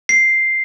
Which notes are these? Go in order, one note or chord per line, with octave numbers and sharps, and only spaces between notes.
C7